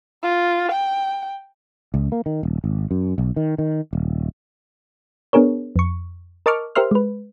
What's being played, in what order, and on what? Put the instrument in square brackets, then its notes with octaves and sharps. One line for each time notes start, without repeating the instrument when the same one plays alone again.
[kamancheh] F4
G5
[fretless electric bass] C#2
A#3
D#3
D#1
G#1
F#2
B1
D#3
D#3
D#1
[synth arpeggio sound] B3 D4 G#4 A#4 C#5
F2 C#6
A#4 D#5 A5 C#6 D6 F6
G4 A#4 C5 E5 C6 F6
G#3 B4